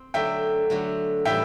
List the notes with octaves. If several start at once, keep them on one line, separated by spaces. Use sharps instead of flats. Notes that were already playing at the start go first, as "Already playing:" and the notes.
Already playing: C4
D3 F#3 A3 E5 G5
D3 F#3 A3
A2 E3 G3 E5 G5